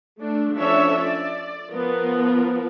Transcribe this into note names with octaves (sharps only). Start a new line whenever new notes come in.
A3 D4
F3 C#4 D4 A4 C#5 E5
D5
F3 B3 A#4